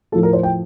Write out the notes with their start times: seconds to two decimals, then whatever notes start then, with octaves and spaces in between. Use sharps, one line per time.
0.12 A2 F3 A4
0.23 A#4
0.33 C5
0.43 G5